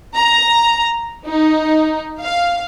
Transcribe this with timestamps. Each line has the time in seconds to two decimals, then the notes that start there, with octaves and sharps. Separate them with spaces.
0.14 A#5
1.25 D#4
2.21 F5